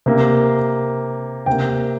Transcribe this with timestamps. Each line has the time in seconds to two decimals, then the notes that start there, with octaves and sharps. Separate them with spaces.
0.06 C3 A#3
1.46 C3 A#3 G5